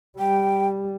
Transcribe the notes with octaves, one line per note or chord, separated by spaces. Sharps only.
G3 G5